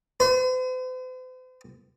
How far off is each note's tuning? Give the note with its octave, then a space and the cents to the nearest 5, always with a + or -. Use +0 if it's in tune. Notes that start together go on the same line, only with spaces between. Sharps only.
C5 -45